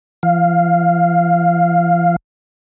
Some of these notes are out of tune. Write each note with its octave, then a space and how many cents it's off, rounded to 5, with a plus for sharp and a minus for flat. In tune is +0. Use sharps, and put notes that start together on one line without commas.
F3 -45 F5 +0